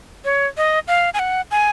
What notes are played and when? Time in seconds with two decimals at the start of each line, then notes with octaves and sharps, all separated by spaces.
0.25 C#5
0.57 D#5
0.88 F5
1.14 G#5
1.19 F#5
1.51 G#5